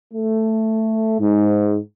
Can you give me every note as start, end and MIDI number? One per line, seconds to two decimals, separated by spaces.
0.14 1.17 57
1.20 1.77 44